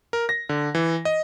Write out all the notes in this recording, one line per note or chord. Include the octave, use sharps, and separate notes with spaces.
A#4
A#6
D3
E3
D#5